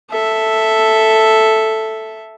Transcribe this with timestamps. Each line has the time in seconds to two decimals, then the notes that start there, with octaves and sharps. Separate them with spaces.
0.10 A4 E5